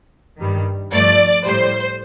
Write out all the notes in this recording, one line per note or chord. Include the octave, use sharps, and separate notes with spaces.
G2 D#3 G3
G2 F3 A3 D5
A2 G3 C5